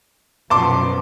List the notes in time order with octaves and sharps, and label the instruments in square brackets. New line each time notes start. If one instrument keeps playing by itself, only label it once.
[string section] F#2 B2 F3 [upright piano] A5 C6 D6